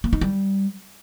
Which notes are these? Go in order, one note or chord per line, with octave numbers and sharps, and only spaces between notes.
A#3
D#4
G3